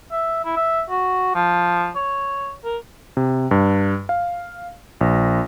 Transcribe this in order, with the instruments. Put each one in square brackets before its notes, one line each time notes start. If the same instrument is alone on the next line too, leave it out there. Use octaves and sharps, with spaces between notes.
[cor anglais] E5
E4
E5
F#4
F3
C#5
A#4
[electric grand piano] C3
G2
F5
A#1